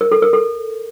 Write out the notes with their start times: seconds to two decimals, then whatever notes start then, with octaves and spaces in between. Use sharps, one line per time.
0.01 A#4
0.12 A4
0.22 A#4
0.33 A4